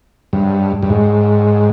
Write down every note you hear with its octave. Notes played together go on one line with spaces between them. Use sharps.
G2
G2
G#2